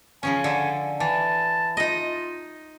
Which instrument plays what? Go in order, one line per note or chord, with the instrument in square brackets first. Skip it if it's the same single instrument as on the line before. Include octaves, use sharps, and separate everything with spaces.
[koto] C#3 F3 C#4 [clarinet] G#5
[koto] D3 A4
[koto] E3 [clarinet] A5
[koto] D#4 D#5 [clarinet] F4